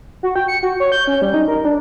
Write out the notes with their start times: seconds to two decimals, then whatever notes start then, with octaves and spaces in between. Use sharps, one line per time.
0.23 F#4
0.36 G5
0.48 C#7
0.63 F#4
0.80 C#5
0.92 G6
1.07 C#4
1.22 G3
1.34 D#4
1.48 A#4
1.65 D4